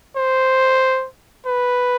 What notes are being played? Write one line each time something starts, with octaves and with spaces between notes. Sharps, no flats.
C5
B4